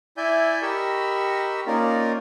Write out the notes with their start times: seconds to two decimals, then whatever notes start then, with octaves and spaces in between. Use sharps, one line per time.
0.17 E4 D5 E5 G#5 G6
0.62 G4 A#4 D#5 B5 C#6 E6
1.67 A#3 C#4 D#4 F4 A#4 D5